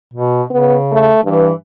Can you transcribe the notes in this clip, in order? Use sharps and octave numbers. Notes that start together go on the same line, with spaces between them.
B2
C#3 B3
A3
G2 E3